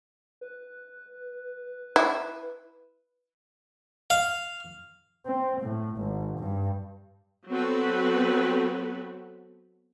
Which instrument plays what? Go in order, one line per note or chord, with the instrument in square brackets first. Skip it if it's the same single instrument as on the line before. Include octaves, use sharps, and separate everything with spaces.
[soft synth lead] B4
[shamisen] E4
[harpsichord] F5
[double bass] C4
A2
G#1
G2
[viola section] F#3 B3 C4 F#4 A4 B4